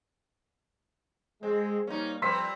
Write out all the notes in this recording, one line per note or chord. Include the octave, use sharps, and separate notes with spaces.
G#3 C4
G3 A#3 C#4 D#4
F2 G3 C4 B4 A#5 C6 E6 B6